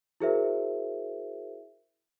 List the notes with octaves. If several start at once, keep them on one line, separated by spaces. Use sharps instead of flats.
E4 F#4 G#4 A#4 C5 E5